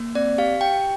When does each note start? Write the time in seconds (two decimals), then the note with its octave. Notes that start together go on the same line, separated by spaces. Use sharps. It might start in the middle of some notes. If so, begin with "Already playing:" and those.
Already playing: A#3
0.15 C4 D5
0.38 G4 F5
0.61 G4 G5